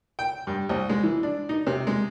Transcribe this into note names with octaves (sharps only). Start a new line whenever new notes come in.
G5
G2
C2
G#3
E3
D4
D#4
C3
G#3